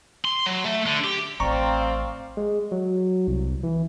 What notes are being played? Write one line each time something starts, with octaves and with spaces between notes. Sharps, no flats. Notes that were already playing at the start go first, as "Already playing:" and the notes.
C6
F#3
A3
D3
G4
A1 C4 D5 F5 A#5 C#6
G#3
F#3
C2
E3